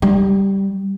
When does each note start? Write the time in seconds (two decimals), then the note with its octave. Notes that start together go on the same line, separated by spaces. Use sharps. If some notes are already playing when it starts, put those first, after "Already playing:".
0.02 G3